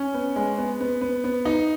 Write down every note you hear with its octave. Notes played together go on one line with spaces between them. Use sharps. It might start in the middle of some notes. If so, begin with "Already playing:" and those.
Already playing: C#4
B3
G#3
B3
B3
B3
B3
D#4